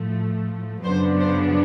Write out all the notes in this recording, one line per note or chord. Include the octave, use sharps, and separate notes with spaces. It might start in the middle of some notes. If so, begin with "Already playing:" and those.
Already playing: A2 F3 A3
F#2 C#3 F#3 B3 D4 C5
C5